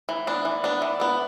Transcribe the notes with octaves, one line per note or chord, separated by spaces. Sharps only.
E3
B3 D4
E3
B3 D4
E3
B3 D4